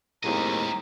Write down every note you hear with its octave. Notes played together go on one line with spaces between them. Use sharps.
D#2 A2 G3 G#3 C4 D#5 A#5